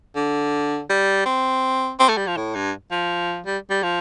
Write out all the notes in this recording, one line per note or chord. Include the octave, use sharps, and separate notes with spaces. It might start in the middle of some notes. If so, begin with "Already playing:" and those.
D3
G3
C4
C4
A3
G3
F3
A2
G2
F3
G3
G3
F3